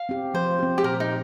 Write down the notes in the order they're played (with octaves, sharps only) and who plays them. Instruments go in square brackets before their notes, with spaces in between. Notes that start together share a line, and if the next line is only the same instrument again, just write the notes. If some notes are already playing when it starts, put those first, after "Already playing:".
Already playing: [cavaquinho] F5
[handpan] C4 G4
[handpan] F3 [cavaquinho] C5
[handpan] C4 G4
[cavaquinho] G4
[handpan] A#2 [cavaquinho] A#4
[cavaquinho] D#4